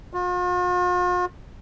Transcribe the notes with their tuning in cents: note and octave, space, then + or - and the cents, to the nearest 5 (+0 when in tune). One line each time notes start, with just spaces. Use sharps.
F4 +45